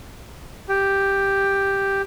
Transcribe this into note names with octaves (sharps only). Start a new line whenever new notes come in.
G4